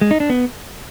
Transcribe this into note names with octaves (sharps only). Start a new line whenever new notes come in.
G#3
D#4
D4
B3